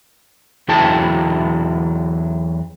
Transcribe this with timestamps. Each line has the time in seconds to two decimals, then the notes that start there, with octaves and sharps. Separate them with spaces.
0.68 E2 F#3 E4 G#4 G5 A5